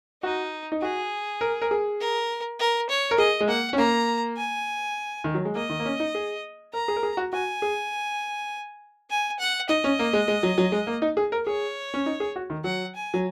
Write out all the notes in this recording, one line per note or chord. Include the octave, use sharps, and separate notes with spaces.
D#4 F#4
D#4
F#4 G#4
A#4
A#4
G#4
A#4
A#4
C#5
A#4
G#4 D#5
G#3
A#3 F#5
C#4
A#3 A#5
G#5
D#3
F#3
G#3
A#3 D#5
D#3
A#3
C#4
D#4
G#4
A#4 A#5
G#4
A#4
G#4
F#4
F#4 G#5
G#4
G#5
F#5
D#4 D#5
C#4
A#3
G#3
G#3
F#3
F#3
G#3
A#3
D#4
G#4
A#4
G#4 C#5
C#4
D#4
G#4
F#4
D#3
F#3 F#5
G#5
F#3